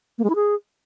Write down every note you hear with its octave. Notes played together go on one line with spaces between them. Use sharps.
A#3
G#3
E4
G#4